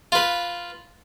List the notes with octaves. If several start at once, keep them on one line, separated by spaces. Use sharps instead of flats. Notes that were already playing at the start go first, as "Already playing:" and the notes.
F4 B4